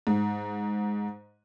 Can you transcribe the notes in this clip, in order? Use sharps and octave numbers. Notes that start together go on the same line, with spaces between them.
G#2